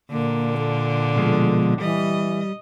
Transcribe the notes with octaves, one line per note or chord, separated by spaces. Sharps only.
A#2 D3 A#3
A4
B2 F3 G#3
E3 G3 D#5